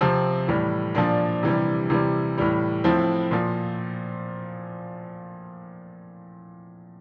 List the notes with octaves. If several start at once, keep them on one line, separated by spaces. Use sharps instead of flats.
C3 F3 C4
A2 E3 G3
A#2 F3 D4
C3 E3 G3
C3 E3 G3
A2 E3 G3
A2 F3 C4 E4
A#2 F3